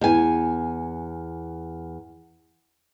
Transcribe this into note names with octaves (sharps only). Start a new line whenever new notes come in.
E2 G#5